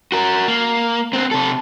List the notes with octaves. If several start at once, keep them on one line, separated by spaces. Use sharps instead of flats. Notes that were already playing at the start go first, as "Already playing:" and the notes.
F#4 A#4
A#3
B3 C4
C3 A4